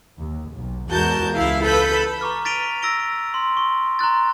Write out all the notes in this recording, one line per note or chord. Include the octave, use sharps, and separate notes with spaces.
D#2
B1
E2 G#2 F#4 A#4 A5 G6
C#2 E4 F5
A4 B4 B5 G6
A#5 C#6 D6 F6
A6 B6 D7 D#7 F7 G7
E6 A#6 D7 G7
C6
C6 C#6
A#5 C6 F#6 A6